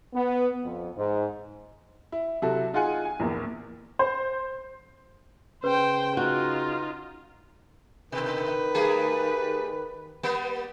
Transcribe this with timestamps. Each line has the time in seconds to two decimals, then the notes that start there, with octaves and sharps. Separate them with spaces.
0.14 B3
0.64 F2
0.97 G#2
2.12 E4
2.42 C3 F#3 E4 F#4 A4
2.73 D#4 F4 G#4 F#5 G#5
3.05 G#5
3.20 A#1 E2 A#2
3.99 C5
5.64 C#3 B4 C5 G5
6.17 D#4 F4 F#4
8.12 B2 D#3 B4
8.75 G3 A3 G#4
10.23 G3 A#3 B3